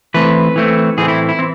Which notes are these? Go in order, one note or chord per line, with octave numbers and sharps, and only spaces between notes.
E3 A3 C4 B4
E3 A3 C4
A2 E3 A3 C4 G#4
E4
E4
E3 C4